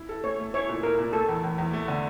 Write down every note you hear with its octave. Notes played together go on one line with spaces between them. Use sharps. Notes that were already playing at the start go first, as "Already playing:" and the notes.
Already playing: E4
A4
A3 C#5
A3
E4 C#5
A#2
E4 A#4
A#2
A3 A4
E2
E2
E2
A3
D3